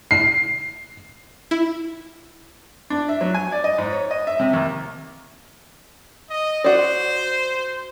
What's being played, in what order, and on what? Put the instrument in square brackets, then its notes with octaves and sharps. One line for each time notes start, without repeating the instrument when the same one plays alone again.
[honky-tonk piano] C7
[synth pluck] E4
[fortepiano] D4
E5
F#3
G#5
D5
D#5
G#2
C#5
D#5
E5
C3
D#2
[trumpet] D#5
[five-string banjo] F#4 D5 [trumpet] C5